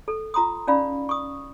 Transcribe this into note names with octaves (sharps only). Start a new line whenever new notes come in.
A4
F4 A#5 C6 D#6
C#4 D#4 D5 F5 B5
C#6 D#6